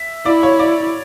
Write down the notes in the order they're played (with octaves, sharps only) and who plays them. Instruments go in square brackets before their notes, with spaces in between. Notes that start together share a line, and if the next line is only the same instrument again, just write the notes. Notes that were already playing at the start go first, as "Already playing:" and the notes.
Already playing: [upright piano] E5
[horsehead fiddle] E4 [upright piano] D5
[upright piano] C#5
D5